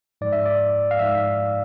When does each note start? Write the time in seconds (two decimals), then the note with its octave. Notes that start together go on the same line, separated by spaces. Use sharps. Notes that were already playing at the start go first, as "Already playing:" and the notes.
0.21 G#2 F3 D5
0.33 E5
0.46 D5
0.91 F5
0.99 G#2 F3 E5